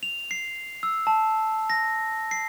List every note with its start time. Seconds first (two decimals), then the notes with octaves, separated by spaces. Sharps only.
0.03 F7
0.31 C7
0.83 E6
1.07 A5
1.70 A#6
2.31 C7